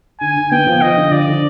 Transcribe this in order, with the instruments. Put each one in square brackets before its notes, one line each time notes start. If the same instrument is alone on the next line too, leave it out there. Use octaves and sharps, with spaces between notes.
[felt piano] D3 [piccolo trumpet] G#5
[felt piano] D3
[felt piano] B3 [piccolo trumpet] G5
[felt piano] F3
[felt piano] F3 [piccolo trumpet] D#5
[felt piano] D3
[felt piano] F3 [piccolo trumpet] D5
[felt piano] D3